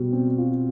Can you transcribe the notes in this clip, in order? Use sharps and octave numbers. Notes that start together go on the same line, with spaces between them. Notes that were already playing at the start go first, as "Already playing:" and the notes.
Already playing: B2 G3
C4
F4